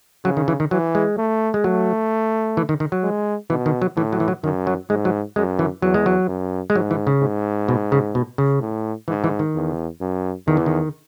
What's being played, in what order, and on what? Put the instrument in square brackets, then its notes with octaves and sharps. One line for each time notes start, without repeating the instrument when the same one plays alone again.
[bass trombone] C#3 [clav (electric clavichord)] F#3
[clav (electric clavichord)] D#3
E3
D#3
[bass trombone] E3 [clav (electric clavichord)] F#3
[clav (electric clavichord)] G#3
[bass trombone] A3
[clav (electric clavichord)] G#3
[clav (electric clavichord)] F#3 [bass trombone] A3
[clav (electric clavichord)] E3
D#3
D#3
F#3
[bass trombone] G#3
[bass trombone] B2 [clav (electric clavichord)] E3
[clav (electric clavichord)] D#3
F#3
[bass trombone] A2 [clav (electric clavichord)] E3
[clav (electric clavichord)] F#3
E3
F#3
[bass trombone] F#2 [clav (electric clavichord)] D#3
[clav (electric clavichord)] F#3
[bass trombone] G#2 [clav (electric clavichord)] G#3
[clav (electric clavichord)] F#3
[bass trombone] F#2 [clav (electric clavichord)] G#3
[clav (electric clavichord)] E3
[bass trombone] E2 [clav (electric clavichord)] F#3
[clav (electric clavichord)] G#3
F#3
[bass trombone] F#2
[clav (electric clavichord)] G#3
[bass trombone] G#2 [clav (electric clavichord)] F#3
[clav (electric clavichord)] E3
C#3
[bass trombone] G#2
[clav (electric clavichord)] B2
C#3
B2
C#3
[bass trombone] A2
[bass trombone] G#2 [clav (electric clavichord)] E3
[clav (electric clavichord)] E3
D#3
[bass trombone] E2
F#2
[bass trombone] E2 [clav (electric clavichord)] D#3
[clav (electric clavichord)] E3
D#3